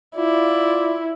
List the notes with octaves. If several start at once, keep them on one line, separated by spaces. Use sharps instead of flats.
E4 F4 D5